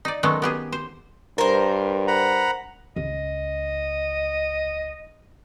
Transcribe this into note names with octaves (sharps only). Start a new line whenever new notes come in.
D#4 D5
D#3 F#3 G#3 A3 B3 C#4
B3 G4 G#4
C5
G2 A#4 C5
F#5 A#5 B5
C#2 D#5